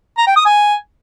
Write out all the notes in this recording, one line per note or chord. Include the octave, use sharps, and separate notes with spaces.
A#5
G5
D#6
G#5